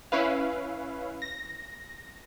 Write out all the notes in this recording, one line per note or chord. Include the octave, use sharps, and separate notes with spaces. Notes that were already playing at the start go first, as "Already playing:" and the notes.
C#4 E4 B4 F5
A#6